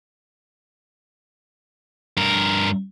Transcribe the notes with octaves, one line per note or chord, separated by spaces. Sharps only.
G2 A#4